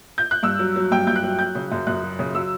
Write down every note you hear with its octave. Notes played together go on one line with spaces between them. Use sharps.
G6
F#6
G2 E6
F#3
F#3
G2 G5
G2 G6
F#6
F#3
F#3 G6
C#3
F#2
F#2 F#6
F#3
C#3
F#3 E6